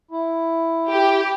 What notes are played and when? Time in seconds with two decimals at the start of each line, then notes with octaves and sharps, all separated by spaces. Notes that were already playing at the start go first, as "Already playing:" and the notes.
0.11 E4
0.89 G4